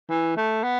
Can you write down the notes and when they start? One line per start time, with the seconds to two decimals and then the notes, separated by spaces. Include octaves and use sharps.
0.10 E3
0.37 A3
0.64 B3